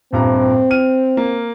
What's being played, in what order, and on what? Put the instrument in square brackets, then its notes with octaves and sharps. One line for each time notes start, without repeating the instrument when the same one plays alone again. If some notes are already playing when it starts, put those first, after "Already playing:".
[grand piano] D#1 G2 A#5 [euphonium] C4
[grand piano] F6 D#7
A#3